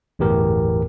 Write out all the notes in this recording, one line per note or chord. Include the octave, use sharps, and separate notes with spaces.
G1 E2 A2 B3 G4 A#4